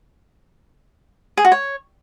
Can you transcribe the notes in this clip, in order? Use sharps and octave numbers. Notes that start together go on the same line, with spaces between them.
G#4
F#4
C#5